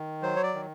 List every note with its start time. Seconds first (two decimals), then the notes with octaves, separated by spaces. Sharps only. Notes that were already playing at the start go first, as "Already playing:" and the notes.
Already playing: D#3
0.22 F#3 C5
0.36 C#5
0.43 D5
0.54 D#3